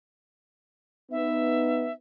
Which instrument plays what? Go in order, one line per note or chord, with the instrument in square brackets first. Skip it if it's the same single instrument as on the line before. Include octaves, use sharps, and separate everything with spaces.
[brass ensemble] B3 D#4 [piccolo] E5